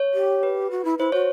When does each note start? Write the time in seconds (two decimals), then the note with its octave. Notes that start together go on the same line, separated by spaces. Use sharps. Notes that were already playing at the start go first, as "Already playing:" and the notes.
Already playing: C#5
0.14 G4
0.43 B4
0.71 F#4
0.85 E4
0.99 E4 C5
1.12 F#4 C#5